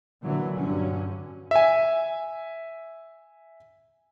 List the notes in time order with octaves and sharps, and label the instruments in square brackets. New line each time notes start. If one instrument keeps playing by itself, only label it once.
[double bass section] A#2 D3 E3 F#3
G2 D3 F#3 C#4
[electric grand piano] E5 G#5